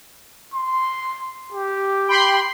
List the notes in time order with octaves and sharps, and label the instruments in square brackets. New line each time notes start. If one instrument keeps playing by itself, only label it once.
[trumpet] C6
G4
[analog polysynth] G5 B5 C6